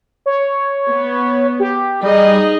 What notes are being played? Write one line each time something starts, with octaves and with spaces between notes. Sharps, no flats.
C#5
B3
G4
G3 D#4 G#4 D#5